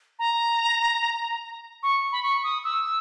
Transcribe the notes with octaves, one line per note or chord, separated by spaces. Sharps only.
A#5
C#6
B5
C#6
D#6
E6